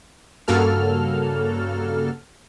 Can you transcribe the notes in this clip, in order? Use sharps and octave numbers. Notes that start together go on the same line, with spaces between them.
G2 C#3 A#3 F#4 A4 F6